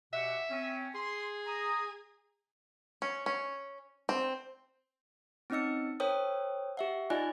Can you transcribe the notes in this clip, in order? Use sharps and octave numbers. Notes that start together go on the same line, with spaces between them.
B2 G4 E5 F#5
C4 C#4
G#4 C6
A#5 D#6
C#4
C#4
C4
C4 C#4 D#4 D#5 E6 C#7
A#4 C5 C#5 G5 D#6
G4 E5 F#5
D#4 F4 D5 D#5 G#5 F#6